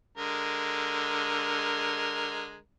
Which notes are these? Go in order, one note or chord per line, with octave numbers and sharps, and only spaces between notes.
D3 G#3 A#4